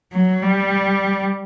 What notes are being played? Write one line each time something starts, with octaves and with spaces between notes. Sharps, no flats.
F#3
G3